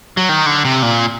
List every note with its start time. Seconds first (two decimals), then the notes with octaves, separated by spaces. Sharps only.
0.17 F#3
0.29 D#3
0.46 D3
0.65 C3
0.82 A#2